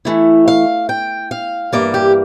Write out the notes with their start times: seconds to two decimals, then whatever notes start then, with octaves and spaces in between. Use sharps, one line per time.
0.05 E3 A3 E4
0.48 F5
0.89 G5
1.31 F5
1.73 G2 E3 A#3 D5
1.94 G4